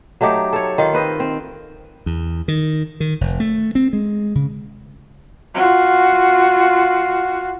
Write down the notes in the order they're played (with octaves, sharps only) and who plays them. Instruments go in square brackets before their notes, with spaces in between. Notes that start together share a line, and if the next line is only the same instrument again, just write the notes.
[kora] F#3 A3 D#4 G4
A4 C#5
D#3 F4
C4 B4 D#5
C4
[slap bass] E2
D#3
D#3
F1
A3
C4
G#3
C#3
[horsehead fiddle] F4 F#4